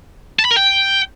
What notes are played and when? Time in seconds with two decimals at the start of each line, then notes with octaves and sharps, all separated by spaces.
0.39 A5
0.45 B5
0.51 A#4
0.56 G5